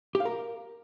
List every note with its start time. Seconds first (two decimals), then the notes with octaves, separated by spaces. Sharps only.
0.15 G4
0.20 F5
0.25 A#4